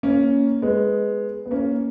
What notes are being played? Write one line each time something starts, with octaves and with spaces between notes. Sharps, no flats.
A#3 C#4
G#3 B3
B3
A#3 C#4